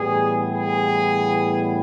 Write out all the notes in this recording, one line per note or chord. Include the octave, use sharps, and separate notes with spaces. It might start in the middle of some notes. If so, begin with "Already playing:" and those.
Already playing: A2 E3 G3 B3 G#4
G#4